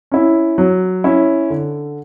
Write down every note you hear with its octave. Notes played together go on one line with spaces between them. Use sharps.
C#4 E4
F#3
C#4 E4
D3